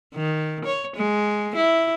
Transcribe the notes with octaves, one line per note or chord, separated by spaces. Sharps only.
D#3
C#5
G#3
E4